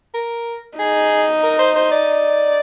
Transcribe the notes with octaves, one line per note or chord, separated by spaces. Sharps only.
A#4
D#4 G#4
A#4
C5
C5
D5